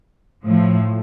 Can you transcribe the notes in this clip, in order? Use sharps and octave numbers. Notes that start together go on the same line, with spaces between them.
A2 F3